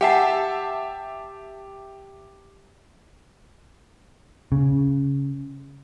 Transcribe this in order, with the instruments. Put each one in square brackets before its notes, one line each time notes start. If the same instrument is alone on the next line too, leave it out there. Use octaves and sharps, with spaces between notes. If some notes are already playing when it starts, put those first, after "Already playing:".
[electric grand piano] G4 E5 A5 [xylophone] F#5 G#5 C7
[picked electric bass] C#3